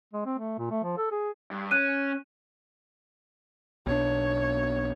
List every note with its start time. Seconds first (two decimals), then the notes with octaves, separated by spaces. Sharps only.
0.13 G#3
0.25 C4
0.38 A3
0.58 A#2
0.70 A3
0.83 F3
0.98 A4
1.11 G#4
1.51 G2
1.71 C#4 F#6 D#7
3.87 B1 B2 D4 C#5